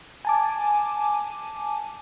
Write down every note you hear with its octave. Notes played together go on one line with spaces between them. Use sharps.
G#5 A5 D6